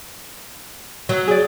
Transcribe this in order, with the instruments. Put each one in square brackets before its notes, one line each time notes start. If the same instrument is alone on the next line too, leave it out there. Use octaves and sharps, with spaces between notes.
[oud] F#3
[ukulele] G#4 D5